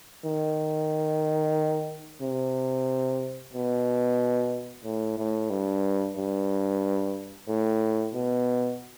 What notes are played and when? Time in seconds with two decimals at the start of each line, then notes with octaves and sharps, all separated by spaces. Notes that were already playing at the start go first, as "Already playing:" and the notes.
0.25 D#3
2.22 C3
3.54 B2
4.84 A2
5.18 A2
5.50 G2
6.16 G2
7.48 A2
8.14 B2